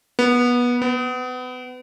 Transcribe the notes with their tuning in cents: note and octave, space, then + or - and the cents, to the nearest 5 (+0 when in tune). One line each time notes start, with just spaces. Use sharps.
B3 -20
B3 +30